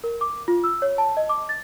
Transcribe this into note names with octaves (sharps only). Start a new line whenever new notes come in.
A#4
D6
F4
E6
C#5
A5
D#5
D6
A6